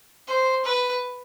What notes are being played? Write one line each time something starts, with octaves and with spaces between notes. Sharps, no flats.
C5
B4